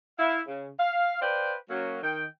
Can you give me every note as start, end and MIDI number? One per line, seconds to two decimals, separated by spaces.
0.19 0.40 64
0.19 0.40 77
0.48 0.68 49
0.79 1.19 77
1.21 1.54 71
1.21 1.54 72
1.21 1.54 74
1.21 1.54 77
1.21 1.54 79
1.70 1.98 54
1.70 1.98 58
1.70 1.98 61
2.02 2.25 51
2.02 2.25 79